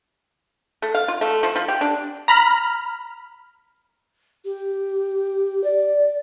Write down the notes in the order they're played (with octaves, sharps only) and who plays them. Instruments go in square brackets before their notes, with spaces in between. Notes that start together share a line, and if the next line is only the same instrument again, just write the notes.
[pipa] A3
F5
F4
A3
F3
F3
G4
D4
[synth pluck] A#5 B5 F6
[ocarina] G4
D5